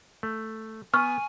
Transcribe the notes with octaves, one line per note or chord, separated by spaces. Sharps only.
A3
B3 G#5 C#6 F6